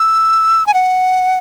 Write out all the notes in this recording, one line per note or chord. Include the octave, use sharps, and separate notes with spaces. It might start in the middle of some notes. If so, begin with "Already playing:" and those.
Already playing: E6
G#5
F#5